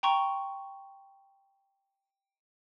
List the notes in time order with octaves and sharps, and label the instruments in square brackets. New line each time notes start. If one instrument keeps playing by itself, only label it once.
[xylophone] G5 A#5 C6 C#6